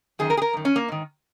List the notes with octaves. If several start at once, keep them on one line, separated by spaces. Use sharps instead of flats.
F#2 D#3 G#4
A#4
G#4
A#4
F#2 D#3
C#4
A#3
G#2 D#3